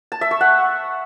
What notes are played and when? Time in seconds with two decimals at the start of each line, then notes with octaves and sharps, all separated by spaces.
0.12 A5
0.21 E5
0.31 C#6
0.41 F#5